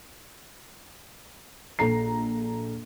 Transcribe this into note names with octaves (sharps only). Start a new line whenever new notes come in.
A#1 A4 A#5 C7